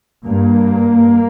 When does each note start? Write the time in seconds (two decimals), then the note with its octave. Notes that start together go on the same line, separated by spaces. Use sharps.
0.24 G2 A#3